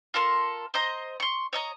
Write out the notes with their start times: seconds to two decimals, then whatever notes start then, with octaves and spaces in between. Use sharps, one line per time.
0.14 F4 A4 A#4 C6
0.74 C5 D#5 A#5
1.20 C6 C#6
1.53 C#5 D#5 A#5